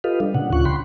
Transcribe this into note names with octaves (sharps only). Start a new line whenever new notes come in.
F4 G4 A4 B4 D#5 F5
G3 D4
A#2 C#3 D4 F#5
D2 C#3 F4 C#6 F#6
G5 B5 C6